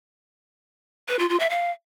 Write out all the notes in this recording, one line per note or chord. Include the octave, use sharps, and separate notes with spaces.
B4
F4
F4
E5
F5